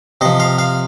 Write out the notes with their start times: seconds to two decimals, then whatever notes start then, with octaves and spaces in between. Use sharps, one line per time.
0.21 C3 F3 D#5
0.40 F5
0.59 F5